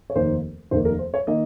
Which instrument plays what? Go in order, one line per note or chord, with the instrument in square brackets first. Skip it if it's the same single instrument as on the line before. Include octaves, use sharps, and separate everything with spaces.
[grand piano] C#5
F1 D#2 D#3 A#3 C5
F1 D#2 D#3 A#3 C5
A#4
C5
C#5
D#3 A#3 D#5